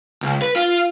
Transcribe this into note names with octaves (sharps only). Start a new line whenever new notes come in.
C#2
B4
F4